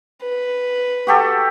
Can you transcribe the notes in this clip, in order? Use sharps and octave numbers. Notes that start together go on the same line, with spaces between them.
B4
F#4 G4 A4